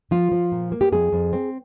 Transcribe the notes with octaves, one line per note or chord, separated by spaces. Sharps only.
F3 F4
F3
A#2
A#3
G4
F2 G#4
F2
C4